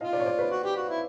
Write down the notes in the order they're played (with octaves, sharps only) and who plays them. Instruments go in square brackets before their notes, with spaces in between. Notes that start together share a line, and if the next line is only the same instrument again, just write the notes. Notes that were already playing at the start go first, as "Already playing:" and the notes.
[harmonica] F4 [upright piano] D#5 F5
[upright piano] C5 D5
C#5
C5 D5
B4 C#5
[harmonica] F#4
G4
F#4
E4